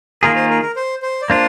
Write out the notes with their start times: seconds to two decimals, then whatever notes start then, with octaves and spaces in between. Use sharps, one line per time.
0.23 D#3 A#3 F4 G#4 A#4
0.36 C5
0.50 A#4
0.62 A#4
0.76 C5
1.02 C5
1.22 D5
1.29 A#3 D4 F4 C5